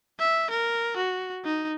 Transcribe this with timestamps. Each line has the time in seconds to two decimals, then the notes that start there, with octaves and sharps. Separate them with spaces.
0.19 E5
0.51 A#4
0.97 F#4
1.45 D#4